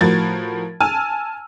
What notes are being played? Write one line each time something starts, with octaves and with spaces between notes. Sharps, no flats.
A2 F3 F#4 A#4 G#6 A6
G#5 A5 E6 F6